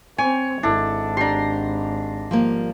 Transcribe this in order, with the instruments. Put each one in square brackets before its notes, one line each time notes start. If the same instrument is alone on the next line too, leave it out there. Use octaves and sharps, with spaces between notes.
[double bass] C4 [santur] C#5 [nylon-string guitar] G#5
[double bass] G#1 [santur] D4 A4 [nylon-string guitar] E4
[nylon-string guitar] D4 G4 [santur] A#5 C6
[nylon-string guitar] F3 G3 A#3